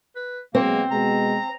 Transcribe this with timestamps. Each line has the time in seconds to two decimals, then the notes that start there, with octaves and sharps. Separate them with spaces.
0.16 B4
0.55 B2 F#3 G#3 A#3 C4
0.91 B2 G#3 A#5